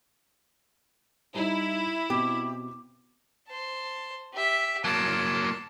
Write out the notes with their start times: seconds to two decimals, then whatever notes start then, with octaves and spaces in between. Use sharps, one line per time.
1.35 G3 D#4 E4
2.10 B2 C4 G4
3.48 C5 A5
4.34 G4 E5
4.85 F#3 A#3 A5